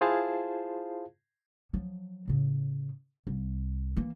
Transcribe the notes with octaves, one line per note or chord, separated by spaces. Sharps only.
E4 F4 G#4 C5 F5 A5
F3 F#3
A2 C#3
C2
E3 A#3